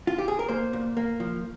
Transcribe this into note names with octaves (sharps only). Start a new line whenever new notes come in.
F4
G4
G#4
A#4
A#3 C5
A#2
A#3
F3